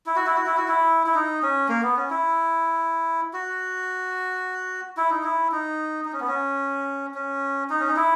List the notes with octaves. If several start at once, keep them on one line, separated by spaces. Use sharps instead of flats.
E4
F#4
E4
F#4
E4
F#4
E4
E4
D#4
C#4
A#3
B3
C#4
E4
F#4
E4
D#4
E4
D#4
D#4
C#4
B3
C#4
C#4
D#4
C#4
D#4
E4